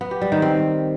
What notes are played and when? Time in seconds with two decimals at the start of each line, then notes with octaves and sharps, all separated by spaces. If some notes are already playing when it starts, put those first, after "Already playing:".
0.01 B3
0.11 G4
0.21 G3
0.32 D#3
0.42 C4